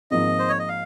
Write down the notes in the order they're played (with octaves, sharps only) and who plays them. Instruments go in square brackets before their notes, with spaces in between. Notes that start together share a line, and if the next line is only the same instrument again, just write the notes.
[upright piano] G#1 G#2 F3 A#3 D#4 [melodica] D#5
[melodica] C5
C#5
D#5
F5